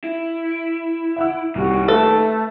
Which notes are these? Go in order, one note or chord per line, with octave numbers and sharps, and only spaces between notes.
E4
E5 F#5 E6
C2 A#2 D#3 F#4
A3 A4 B4